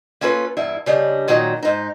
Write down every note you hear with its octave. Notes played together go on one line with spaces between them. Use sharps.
A#3 C#4 F4 A4 B4
E2 G2 E4
C#3 G3 D4 D#5
A#2 D#3 F#3 D#4
G#2 D#4